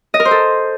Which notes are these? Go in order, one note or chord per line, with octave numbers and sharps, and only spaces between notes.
D#5
A#4
C5
A4